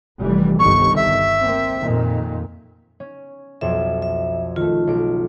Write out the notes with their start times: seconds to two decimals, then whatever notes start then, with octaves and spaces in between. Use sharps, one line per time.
0.20 F1 E3 G3
0.59 G1 C2 D#3 C#6
0.96 E5
1.41 A#3 C4
1.81 F2 A#2 D#3
3.00 C#4
3.61 B1 F2 E5
4.02 E5
4.56 D#3 A3 F4
4.87 B1 D7